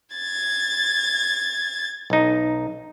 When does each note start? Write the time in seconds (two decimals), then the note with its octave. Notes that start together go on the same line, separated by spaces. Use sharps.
0.15 G#6 A6
2.10 B1 D#4